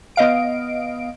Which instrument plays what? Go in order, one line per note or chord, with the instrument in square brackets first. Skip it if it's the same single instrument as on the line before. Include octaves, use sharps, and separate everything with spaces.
[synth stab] B3 D#5 F5 D7